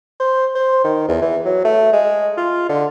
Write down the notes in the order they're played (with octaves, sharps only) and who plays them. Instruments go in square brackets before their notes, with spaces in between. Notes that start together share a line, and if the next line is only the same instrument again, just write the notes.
[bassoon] C5
C5
D#3
E2
E3
F#3
A3
G#3
F4
D3